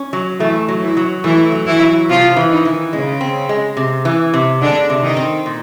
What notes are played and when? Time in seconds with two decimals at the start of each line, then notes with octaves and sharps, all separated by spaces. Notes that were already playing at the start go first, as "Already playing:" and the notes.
Already playing: C#4
0.13 F#3
0.40 E3 A3 E4
0.68 F#3
0.83 E3 E4
0.97 F#3
1.24 E3 A3 E4
1.52 F#3
1.67 E3 E4
1.81 F#3
2.09 C3 F3 F4
2.37 E3
2.50 D#3 D#4
2.65 E3
2.93 C#3 G#3 C#4
3.21 C4
3.49 G#3
3.77 C3
4.05 E3
4.34 C3
4.61 D3 G#3 D4
4.90 C3
5.03 D#3 D#4
5.17 C4
5.46 A#2